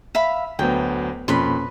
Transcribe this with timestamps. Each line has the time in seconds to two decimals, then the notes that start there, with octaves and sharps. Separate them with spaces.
0.15 E5 F5 B5
0.59 D2 F#3 B3 G5
1.28 F2 B2 A#3 C#4 B4 B5 C6